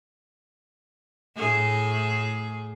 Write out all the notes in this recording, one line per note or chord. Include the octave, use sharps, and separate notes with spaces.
A2 A3 G#4